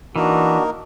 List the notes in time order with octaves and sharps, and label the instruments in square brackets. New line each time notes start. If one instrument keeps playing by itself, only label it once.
[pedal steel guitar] E3 [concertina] A#3 D#4 A#4 [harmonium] D4 F#4